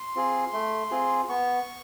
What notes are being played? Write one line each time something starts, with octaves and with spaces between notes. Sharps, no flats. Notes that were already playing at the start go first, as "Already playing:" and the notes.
Already playing: C6
C4 F4 G#4
A3
C4 F4 G#4
B3 C#6